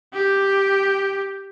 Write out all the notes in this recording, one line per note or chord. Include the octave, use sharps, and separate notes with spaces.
G4